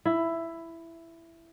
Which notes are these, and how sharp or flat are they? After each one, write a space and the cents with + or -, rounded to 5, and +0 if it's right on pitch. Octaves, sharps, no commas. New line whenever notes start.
E4 +10